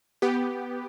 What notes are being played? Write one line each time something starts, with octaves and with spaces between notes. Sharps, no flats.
B3 G4